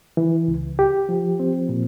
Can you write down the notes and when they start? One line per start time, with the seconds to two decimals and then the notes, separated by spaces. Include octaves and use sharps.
0.17 E3
0.48 C#2
0.79 G4
1.09 F3
1.40 C4
1.69 A#2